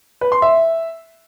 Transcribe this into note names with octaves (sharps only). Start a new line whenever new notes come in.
B4
C6
E5